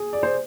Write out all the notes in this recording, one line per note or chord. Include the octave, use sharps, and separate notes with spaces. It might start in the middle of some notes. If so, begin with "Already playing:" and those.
Already playing: G#4
D5
C5